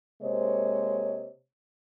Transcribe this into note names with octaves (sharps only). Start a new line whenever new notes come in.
C3 G#3 A#3 C5 C#5 D#5